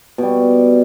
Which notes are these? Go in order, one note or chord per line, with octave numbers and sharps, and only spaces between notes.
B2 G3